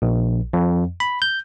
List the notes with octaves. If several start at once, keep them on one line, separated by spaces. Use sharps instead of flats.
A#1
F2
B5
G6